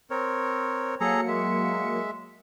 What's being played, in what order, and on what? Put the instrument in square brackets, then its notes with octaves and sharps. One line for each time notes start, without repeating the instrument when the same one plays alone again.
[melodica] C4 A#4 C#5
[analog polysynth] F#3 A#3 C#7 [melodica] G#4 A4 A#5
[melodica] G#3 E5